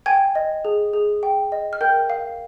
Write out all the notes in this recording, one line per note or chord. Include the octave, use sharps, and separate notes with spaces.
G5 G#5 G#6
D#5
G#4
G#4
G5
D#5
F6
A#4 G5 G6
F5